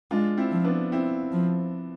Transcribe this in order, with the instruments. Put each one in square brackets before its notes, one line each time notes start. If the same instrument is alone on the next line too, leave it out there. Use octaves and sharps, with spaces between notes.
[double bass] G#3 [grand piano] D4 F4
[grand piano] C4 E4
[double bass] F3
[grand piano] B3 D4
C4 E4
[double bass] F3